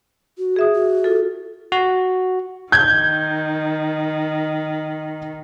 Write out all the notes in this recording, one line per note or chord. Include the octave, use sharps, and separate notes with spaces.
F#4
G#4 E5 D#6
F#4
F4 A4
F#4
D#3 G6 G#6